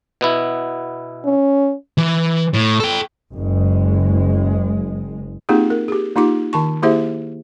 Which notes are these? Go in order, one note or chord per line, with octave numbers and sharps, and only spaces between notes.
B2 B3 E4
C#4
E3
A2
A4 G5
F#1 G#3
A#3 C4 D#4 F4 G4 G#4
A#4
G4 G#4
A#3 D#4 F4 G4 D6
D#3 A5 C#6
A#3 E4 G4 G#4 C5 E5